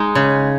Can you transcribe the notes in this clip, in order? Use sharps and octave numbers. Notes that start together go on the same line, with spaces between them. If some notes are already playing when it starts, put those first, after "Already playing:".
Already playing: G#3 D#4
C#3